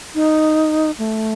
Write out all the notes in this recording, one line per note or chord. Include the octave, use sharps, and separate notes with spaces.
D#4
A3